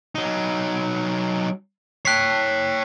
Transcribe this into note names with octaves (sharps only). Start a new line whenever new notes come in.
F#3 D#4
C#5 G5 F#6 B6 C7